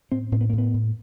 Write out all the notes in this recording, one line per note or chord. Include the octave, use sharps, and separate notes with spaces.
A2 C4
A2 C4
B3
A#3
A2
B3
A2